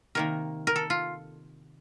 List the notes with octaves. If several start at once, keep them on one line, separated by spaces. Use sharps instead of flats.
C3 D#3 A#3 A#4
A#4
A4
F4